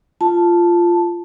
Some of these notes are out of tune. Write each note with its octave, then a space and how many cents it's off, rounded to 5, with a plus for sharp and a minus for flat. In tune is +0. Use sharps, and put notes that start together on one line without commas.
F4 -10 A5 +0